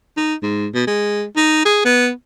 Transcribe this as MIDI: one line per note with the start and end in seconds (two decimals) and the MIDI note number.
0.17 0.35 63
0.42 0.67 44
0.74 0.84 47
0.87 1.24 56
1.36 1.64 63
1.65 1.81 68
1.85 2.10 59